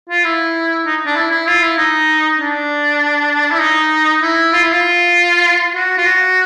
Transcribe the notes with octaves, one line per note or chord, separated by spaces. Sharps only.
F4
E4
D#4
D4
E4
E4
F4
E4
D#4
D4
E4
D#4
E4
F4
E4
F4
F#4
F4
F#4